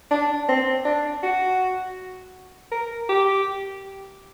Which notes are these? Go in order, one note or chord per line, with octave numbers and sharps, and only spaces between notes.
D4
C4
D4
F#4
A#4
G4